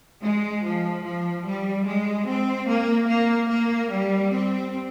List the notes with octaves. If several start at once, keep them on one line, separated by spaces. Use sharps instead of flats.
G#3
F3
F3
G3
G#3
C4
A#3
A#3
A#3
G3
C4